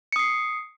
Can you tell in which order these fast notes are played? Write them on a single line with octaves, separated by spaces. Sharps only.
C#7 D#6 C7